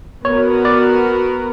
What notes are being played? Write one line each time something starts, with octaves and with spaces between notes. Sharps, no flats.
B3 F#4 A#4 C#5
D5